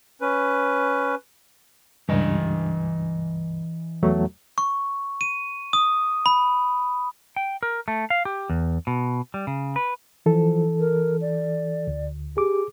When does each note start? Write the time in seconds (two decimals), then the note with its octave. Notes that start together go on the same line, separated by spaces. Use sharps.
0.21 C#4 B4
2.09 C#2 G2 E3 D#5
4.03 E2 F#3 A3
4.58 C#6
5.21 D#7
5.73 D#6
6.26 B5
7.36 G5
7.63 A#4
7.88 A3
8.10 F5
8.25 G4
8.50 E2
8.87 B2
9.34 G3
9.47 C#3
9.76 B4
10.26 E3 F3 A4
10.80 A#4
11.21 D5
11.87 D2
12.37 G4 G#4 D6